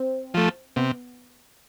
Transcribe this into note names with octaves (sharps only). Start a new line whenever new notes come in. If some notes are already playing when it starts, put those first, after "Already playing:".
Already playing: C4
F3 A3
C3 B3